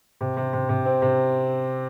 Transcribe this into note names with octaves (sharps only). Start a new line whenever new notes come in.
C3
C3
C3
C3
C4
C3